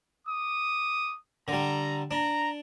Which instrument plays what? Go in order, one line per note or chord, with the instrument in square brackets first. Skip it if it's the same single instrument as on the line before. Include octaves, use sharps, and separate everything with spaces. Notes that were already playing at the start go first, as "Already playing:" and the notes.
[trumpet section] D6 D#6
[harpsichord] D3 G3 [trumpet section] A#5
[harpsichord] D4 [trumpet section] A#5